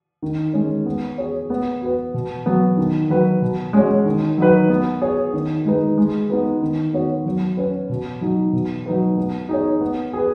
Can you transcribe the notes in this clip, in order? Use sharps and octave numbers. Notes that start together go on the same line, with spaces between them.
D#3
G#3 C#4
B3
G#4 C#5
B3
F#4 B4
B2
F#3 B3
D#3
F#3 D#4 B4
B2
G#3 C#4 F#4 C#5
D#3
F#3 D#4 B4
B3
G#4 C#5
D#3
G#3 D#4 B4
G#3
B3 D#4 B4
D#3
B3 F#4 C#5
F#3
C#4 B4
B2
F#3 D#4
B2
F#3 D#4 B4
B3
D#4 G#4 C#5
B3
G#4 B4